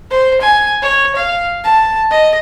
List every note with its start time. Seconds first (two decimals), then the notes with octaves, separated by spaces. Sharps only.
0.10 C5
0.41 G#5
0.82 C#5
1.16 F5
1.64 A5
2.10 D#5